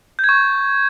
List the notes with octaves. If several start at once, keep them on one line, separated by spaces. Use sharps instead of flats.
G6
G#6
C#6